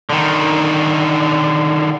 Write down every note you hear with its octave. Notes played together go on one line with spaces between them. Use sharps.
D3 D#3